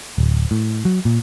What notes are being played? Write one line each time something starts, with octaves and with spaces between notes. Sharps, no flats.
D1
A2
F#3
A#2